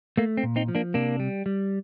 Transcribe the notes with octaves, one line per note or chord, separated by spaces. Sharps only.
A3 A#3
C4
A#2
C4 D#4
F3
A#3 D4
C3 A#3 D4
G3
G3